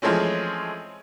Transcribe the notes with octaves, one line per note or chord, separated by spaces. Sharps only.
E3 F3 G#3 A3 C4 C#4